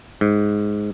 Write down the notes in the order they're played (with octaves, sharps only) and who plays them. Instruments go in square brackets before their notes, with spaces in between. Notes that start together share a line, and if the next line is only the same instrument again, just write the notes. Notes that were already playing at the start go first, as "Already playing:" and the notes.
[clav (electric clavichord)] G#2